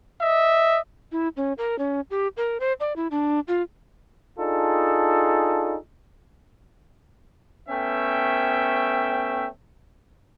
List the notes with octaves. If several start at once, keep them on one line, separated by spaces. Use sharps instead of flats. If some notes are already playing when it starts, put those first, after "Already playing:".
D#5 E5
E4
C#4
A#4
C#4
G4
A#4
C5
D5
E4
D4
F4
D4 D#4 F4 G#4 A4
A3 B3 C#4 E5 G5